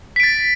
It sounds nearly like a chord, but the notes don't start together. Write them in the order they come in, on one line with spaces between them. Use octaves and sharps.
B6 D7 A6